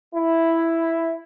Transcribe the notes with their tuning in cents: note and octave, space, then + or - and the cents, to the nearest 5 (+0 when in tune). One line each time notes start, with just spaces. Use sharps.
E4 +0